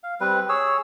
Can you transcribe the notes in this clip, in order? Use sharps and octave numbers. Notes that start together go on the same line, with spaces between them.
F5
G3 C4 B4
G#4 C#5 E6